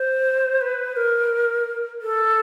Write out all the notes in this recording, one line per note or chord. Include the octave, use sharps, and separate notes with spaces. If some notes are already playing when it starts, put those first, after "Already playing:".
Already playing: C5
B4
A#4
A4